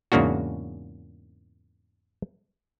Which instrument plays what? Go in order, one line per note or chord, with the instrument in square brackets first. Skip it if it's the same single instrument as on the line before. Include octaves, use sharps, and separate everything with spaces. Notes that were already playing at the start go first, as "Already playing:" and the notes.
[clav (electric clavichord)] E2 G#2 C#3 A#3 D4 F#4